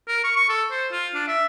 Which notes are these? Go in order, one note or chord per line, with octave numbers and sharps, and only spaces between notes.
A#4
C#6
C#6
A4
C5
F4
D4
E5